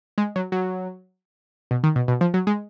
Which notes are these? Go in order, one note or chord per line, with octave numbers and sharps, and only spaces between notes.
G#3
F#3
F#3
B2
D#3
B2
B2
F3
F#3
G#3